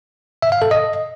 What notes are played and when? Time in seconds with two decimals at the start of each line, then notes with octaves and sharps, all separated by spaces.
0.42 E5
0.52 F5
0.62 A4
0.71 D#5